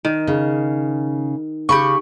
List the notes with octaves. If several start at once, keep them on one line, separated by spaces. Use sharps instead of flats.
D#3
C#3
C#3 G4 B5 C#6